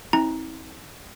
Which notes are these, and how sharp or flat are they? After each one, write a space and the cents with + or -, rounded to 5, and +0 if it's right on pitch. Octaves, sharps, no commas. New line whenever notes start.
C4 +20 E4 -45 A#5 +0